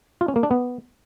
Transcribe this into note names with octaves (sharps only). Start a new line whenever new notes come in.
F4
C#4
A#3
D4
B3